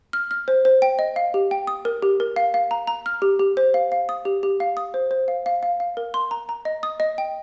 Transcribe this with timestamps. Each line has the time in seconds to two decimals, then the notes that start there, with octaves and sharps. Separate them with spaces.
0.13 F6
0.31 F6
0.48 C5
0.65 C5
0.82 G5
0.99 D#5
1.16 F5
1.34 G4
1.51 G5
1.67 D#6
1.85 A#4
2.02 G4
2.20 A#4
2.36 F5
2.54 F5
2.71 A#5
2.87 A#5
3.06 F6
3.22 G4
3.39 G4
3.57 C5
3.74 F5
3.92 F5
4.09 D#6
4.25 G4
4.43 G4
4.60 F5
4.77 D#6
4.94 C5
5.11 C5
5.28 F5
5.46 F5
5.63 F5
5.80 F5
5.97 A#4
6.14 C6
6.31 A#5
6.49 A#5
6.65 D#5
6.83 D#6
7.00 D#5
7.18 G5